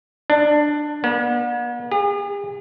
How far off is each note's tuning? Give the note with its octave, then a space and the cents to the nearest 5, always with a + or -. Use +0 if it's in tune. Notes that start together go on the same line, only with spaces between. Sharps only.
D4 +15
B3 -45
G#4 -45